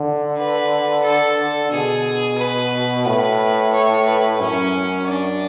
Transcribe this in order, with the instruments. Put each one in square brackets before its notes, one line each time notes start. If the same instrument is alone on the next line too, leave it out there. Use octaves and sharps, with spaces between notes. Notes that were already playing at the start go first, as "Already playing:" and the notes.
Already playing: [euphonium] D3
[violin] B4
A4
[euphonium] B2 [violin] G#4
[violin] B4
[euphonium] A2 [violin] B4
[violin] C#5
B4
[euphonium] F#2 [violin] C#4
[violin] D4